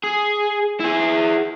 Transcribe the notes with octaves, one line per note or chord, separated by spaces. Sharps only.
G#4
E4 G#4